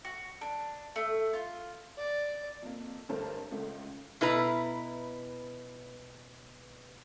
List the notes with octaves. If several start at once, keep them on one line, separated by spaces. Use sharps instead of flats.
F#4
D4
A3
F4
D5
F2 A#3
G1 G2 A3 A#4 C5 A5
C#2 A3
B2 E4 B4 A#5